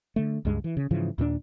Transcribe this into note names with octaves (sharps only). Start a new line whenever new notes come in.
D3 A3
C#2 G2 G#3
E3
C#3
G#2 C#3 E3 F3
D#2 A#2 A3 D4